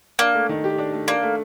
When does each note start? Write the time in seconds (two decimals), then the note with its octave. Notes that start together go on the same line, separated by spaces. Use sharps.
0.19 A#3 D4
0.34 A3
0.49 D#3
0.64 G4
0.78 D4
0.93 A3
1.08 A#3 D4
1.23 A3